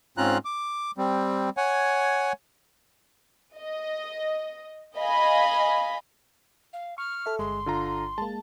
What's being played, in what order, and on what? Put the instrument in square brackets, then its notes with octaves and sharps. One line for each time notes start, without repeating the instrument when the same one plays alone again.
[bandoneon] G#2 C4 C#4 F4 A#5 F#6
D6
G3 C4
C#5 F#5 G#5
[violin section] D#5
D#5 F5 G#5 B5
[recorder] F5
[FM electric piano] C#6 [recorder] F6
[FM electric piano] A4 E5
[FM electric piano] G1 [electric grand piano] G#3 [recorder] C6
[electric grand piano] D3 F4 A#5
[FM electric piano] G#3 A#3 [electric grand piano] A5